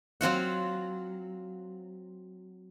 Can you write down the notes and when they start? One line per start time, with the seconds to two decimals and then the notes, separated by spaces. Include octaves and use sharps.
0.21 F#3 C4 F4 F#5